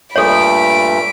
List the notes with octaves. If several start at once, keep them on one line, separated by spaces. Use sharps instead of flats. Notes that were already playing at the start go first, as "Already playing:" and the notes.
G2 A#2 A3 A4 C#5 B5 D7